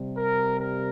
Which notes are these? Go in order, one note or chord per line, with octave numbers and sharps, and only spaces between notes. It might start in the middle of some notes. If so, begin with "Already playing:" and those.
Already playing: C3 G3
A#4
A#4